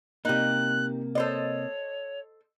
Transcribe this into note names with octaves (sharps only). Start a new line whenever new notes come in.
C3 A#3 D#4 G4 F#6
A4 C5 C#5 D#5